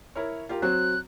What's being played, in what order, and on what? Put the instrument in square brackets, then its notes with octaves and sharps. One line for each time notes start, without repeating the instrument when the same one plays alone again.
[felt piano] E4 A#4 C#5
F4 G4 A#4
[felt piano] F#3 C4 F#4 [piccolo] F#6